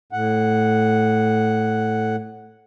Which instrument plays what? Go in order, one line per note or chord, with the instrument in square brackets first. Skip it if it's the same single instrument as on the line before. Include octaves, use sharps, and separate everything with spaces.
[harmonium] A2 F#5